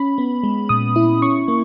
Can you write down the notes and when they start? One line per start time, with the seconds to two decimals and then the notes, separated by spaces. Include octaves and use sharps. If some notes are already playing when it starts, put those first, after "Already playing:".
Already playing: C#4 B5
0.18 B3
0.43 G#3
0.69 A#2 D#6
0.96 E4
1.22 C#4 C#6
1.48 A#3